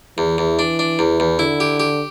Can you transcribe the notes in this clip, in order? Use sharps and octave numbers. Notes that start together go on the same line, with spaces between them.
E2 E3
E2
D4
D4
E2
E2
D3 E4
G4
G4